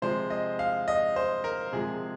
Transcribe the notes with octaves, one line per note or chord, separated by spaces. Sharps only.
C3 F3 G#3 C5
D#5
F5
D#5
C5
A#4
C3 F3 G#3 G#4